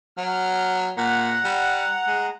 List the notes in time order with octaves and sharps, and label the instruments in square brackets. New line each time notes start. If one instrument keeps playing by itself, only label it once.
[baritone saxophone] F#3 [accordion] F6
[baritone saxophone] A#2 [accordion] F#5 A#5
[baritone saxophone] G3
G#3